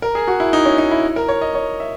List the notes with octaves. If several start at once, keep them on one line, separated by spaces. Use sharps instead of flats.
A#4
G#4
F#4
E4
D#4
C#4
D#4
E4
A#4
C#5
D#5
C#5
E5